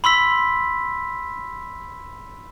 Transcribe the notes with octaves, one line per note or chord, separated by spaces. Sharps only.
B5 C6 E6 B6